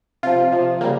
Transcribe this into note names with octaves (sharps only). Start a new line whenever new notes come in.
C3 F3 F4
C3 F3
C#3 G3 A#3